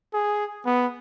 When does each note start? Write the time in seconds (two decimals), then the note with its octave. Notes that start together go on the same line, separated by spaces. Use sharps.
0.14 G#4
0.66 B3